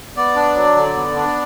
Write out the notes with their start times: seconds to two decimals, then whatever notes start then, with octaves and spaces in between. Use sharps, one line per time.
0.17 B3 D5
0.36 D4
0.56 F#3
0.76 D3
0.96 B3
1.16 D4